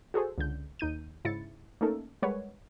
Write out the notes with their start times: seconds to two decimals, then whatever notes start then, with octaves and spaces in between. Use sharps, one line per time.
0.14 F#4 G#4 A4 C5
0.38 C#2 D3 G6
0.79 D#2 D#4 G6 D#7
1.25 G#2 C#3 E4 A6 C#7
1.81 A3 A#3 C#4 D#4 A4 A#4
2.22 G3 G#3 A#4 B4 C#5 F#5